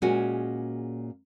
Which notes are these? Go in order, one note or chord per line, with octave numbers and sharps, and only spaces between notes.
A#2 G#3 C#4 F#4